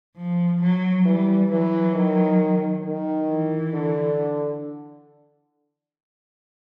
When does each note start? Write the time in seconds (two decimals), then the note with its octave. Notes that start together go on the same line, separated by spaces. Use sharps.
0.17 F3
0.62 F#3
1.06 E3 G3
1.51 E3 F#3
1.95 D#3
2.84 D#3
3.29 E3
3.73 D3